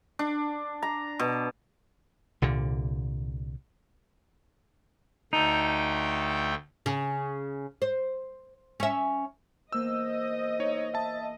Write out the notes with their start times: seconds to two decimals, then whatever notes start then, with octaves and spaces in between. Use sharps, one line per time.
0.19 D4
0.82 A#5
1.19 B2
2.42 C2 A#2 D3
5.33 D2 A3 D#4 G5
6.86 C#3
7.82 C5
8.80 C#4 E5
9.72 E2 A#3 C5 D#5 E6 G6
10.59 D#4 C#5
10.94 E5 A5